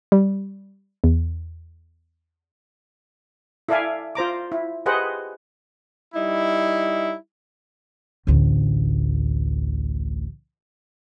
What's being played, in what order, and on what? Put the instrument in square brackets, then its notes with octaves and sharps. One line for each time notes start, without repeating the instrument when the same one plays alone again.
[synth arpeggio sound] G3
E2
[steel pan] E4 A4 D5 E5 F5 G#5
F4 C5 A#5 D6
E4
G4 G#4 B4 C5 D#5 F#5
[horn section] G3 D#4 E4
[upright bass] A1 D2